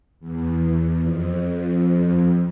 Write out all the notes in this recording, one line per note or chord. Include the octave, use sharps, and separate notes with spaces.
E2
F2